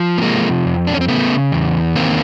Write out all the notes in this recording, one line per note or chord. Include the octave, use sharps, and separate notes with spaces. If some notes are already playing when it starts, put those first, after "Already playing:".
Already playing: F3
B3
C3 G#3 A#3
F2
D4
C#4
C4
C#3 A3 B3
E2
D#3 A#3 C4